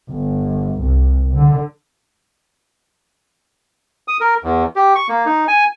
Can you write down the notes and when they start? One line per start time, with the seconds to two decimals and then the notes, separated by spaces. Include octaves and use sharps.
0.11 G1
0.81 C2
1.34 D3
4.08 D#6
4.20 A#4
4.44 E2
4.76 G4
4.95 C#6
5.09 A#3
5.26 D#4
5.48 G#5